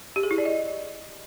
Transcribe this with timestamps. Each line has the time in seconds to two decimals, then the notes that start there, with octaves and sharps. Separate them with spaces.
0.16 G4
0.23 G#4
0.31 E4
0.38 D5
0.45 D#5